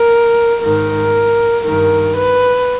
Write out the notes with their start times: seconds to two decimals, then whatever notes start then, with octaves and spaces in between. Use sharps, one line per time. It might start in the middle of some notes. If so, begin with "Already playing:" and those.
Already playing: A#4
0.62 G#2 D#3 A#4
1.64 G2 D#3 A#4
2.15 B4